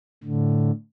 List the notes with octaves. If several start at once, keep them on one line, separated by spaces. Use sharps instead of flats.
A2 D3